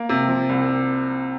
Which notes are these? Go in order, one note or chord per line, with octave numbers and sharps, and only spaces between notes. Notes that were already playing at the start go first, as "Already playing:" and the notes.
Already playing: A#3
C3
F3
C2